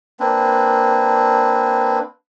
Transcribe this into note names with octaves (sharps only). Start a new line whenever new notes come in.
A#3 C4 D4 B4